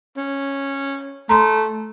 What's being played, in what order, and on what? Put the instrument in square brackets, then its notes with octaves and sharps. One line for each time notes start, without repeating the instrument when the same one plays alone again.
[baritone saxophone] C#4
[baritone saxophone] A3 [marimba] A#5 C6